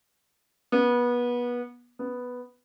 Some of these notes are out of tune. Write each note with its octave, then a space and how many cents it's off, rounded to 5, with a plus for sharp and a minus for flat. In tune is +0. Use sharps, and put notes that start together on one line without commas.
B3 -25
B3 +0